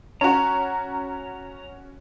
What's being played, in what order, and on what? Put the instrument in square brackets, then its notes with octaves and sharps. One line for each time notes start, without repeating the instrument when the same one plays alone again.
[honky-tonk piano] C#4 F#4 [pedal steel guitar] A#5